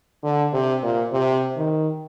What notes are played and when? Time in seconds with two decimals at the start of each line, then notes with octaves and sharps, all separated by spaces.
0.23 D3
0.53 C3
0.83 A#2
1.13 C3
1.57 D#3